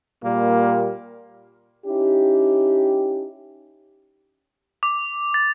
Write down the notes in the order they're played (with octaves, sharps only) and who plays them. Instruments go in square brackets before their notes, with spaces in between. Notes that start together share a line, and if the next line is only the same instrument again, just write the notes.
[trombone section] A#2 G3 A#3
[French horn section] C#4 D#4 E4 G4
[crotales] D6
A6